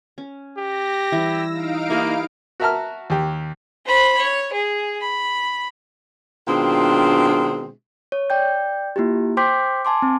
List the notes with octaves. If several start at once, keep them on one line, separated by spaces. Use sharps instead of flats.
C#4
G4 A#6
E3 G3 E6
D#4 F5 D7
A#3 E4 G4 A#4
F#4 A#4 E5 A5 A#5 F6
D#2 G4
C5 B5
C#5
G#4
B5
B2 D#3 G#3 C4 D4 F4
C#5
D5 G5 G6
A#3 E4 F4 G4
C5 G5 C6 D6 G6 B6
G#5 A5 C6 D6
C4